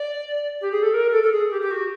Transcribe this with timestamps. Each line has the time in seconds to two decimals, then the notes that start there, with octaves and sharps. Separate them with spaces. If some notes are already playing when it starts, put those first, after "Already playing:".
Already playing: D5
0.61 G4
0.72 G#4
0.83 A4
0.94 A#4
1.12 A4
1.23 A4
1.32 G#4
1.51 G4
1.61 G4
1.71 F#4